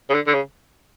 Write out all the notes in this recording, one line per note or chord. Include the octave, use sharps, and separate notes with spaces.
C#3
D3
D3
C#3